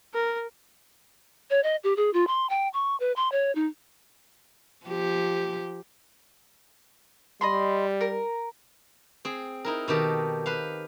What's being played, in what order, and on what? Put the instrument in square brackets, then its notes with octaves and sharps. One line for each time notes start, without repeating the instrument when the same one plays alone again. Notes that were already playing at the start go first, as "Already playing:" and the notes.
[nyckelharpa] A#4
[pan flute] C#5
D#5
G4
G#4
F4
C6
G5
C#6
B4
C6
C#5
D#4
[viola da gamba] F3 G4
[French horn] G3 [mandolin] D#5 B5 C6
[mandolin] A#4
[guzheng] C4 G#4
D#4 E4 A#4
B2 D#3 G4 A4
B4 C5 F5